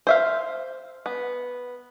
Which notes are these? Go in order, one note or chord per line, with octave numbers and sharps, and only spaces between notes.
C5 E5 F5
B3